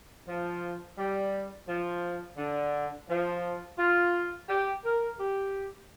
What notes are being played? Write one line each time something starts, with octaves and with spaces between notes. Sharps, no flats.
F3
G3
F3
D3
F3
F4
G4
A#4
G4